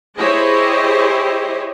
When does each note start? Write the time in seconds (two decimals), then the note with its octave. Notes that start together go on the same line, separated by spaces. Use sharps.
0.17 E4 G4 G#4 C5 C#5 D#5